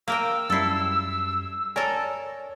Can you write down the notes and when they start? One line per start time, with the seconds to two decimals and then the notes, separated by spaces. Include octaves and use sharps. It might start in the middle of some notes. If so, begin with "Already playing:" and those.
0.08 A#3 A#4 F5 G5 E6
0.50 F#2 G3 E4 A4 C7
1.76 A4 A#4 C#5 D5 G#5